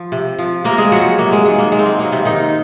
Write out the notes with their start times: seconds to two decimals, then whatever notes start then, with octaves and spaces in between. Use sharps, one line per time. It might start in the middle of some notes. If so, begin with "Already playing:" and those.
Already playing: F3
0.12 C3
0.39 F3
0.65 C3 A#3 A#4
0.78 G#3 G#4
0.92 F3 F#3 F#4
1.18 C3 A#3
1.32 G#3
1.45 D#3 F#3 G#3
1.59 A#3
1.72 C3 G#3
1.79 C4
1.85 A#3
1.99 D#3 F#3 A#3
2.12 C3 C4
2.25 C3 D#3 D#4